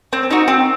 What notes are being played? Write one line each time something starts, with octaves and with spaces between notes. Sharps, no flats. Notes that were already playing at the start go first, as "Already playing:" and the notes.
C4
D#4 F#4
C4